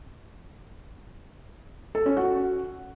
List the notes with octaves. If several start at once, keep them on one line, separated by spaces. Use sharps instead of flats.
A4
C#4
F#4